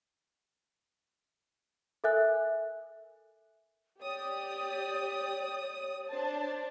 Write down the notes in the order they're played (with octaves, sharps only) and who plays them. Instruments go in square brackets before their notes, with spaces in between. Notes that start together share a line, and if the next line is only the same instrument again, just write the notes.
[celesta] A4 A#4 E5 G#5 F#6
[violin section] G4 D5 D#6 [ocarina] C#5
[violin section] D4 C5 A5